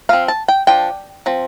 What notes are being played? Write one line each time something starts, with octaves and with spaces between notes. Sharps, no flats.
F3 C4 F5
A5
G5
F3 D4 G5
F3 C4